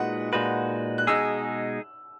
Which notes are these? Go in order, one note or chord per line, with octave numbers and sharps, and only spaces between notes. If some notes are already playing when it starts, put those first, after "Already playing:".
Already playing: A#2 G#3 D#4 F#4 B4 F#5
A#2 G#3 D#4 F#4 B4
F#6
B2 G#3 D#4 G#4 E6